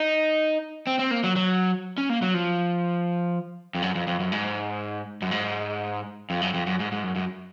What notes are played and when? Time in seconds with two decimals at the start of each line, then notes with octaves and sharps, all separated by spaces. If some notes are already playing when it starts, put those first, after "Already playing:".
Already playing: D#4
0.87 C4
0.99 C4
1.11 A#3
1.24 F#3
1.36 F#3
1.98 C#4
2.10 A#3
2.22 F#3
2.34 F3
3.75 F2
3.82 F#2
3.95 F2
4.07 F2
4.20 F#2
4.32 G#2
5.22 F#2
5.31 G#2
6.30 F2
6.42 F#2
6.54 F2
6.66 F#2
6.80 G#2
6.92 G#2
7.04 F#2
7.16 F#2